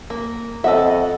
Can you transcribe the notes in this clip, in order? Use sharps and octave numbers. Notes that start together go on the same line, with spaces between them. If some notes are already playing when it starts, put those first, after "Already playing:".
A#3
F2 A4 D#5 E5 F#5